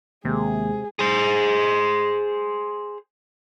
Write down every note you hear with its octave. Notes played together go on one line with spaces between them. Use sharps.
D#2 C3 G#3 G#4
G#4 C5